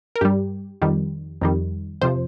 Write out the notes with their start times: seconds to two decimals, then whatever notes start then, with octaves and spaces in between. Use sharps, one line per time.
0.16 A#4
0.21 G2 G3 G4
0.82 F2 D#3 G3
1.42 F2 D#3 G3
2.01 F2 C3 F3 C5